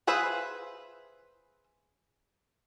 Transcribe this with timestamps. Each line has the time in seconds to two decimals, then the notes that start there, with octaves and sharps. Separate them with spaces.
0.07 F4 G#4 B4 C5 E5